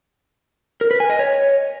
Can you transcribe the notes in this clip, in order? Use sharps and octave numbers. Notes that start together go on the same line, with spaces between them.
A#4
B4
G#5
D#5
C#5